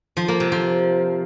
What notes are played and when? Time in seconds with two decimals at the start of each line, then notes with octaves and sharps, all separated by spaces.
0.17 F3
0.28 A#3
0.40 C3
0.52 F3